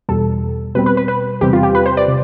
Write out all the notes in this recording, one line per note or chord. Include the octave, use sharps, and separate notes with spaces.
E2 B2 G3 A4
B2 G3 C4 B4
B4
B4
B4
E2 C3 G3 C4 G4
F4
G4
B4
C5
D5
C3